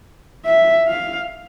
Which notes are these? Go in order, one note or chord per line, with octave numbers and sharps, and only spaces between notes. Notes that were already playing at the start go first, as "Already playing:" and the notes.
E5
F5